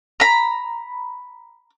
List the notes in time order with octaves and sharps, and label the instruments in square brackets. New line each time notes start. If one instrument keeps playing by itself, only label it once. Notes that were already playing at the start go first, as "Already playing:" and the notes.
[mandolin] A#5 B5